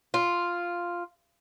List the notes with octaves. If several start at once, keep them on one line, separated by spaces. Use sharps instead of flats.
F4